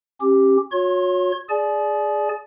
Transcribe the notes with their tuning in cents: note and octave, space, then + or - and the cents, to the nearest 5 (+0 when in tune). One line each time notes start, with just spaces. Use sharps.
C#4 -35 G4 +0
F#4 -40 C#5 +0 C6 +35
G#4 +0 D5 +0 G#5 +45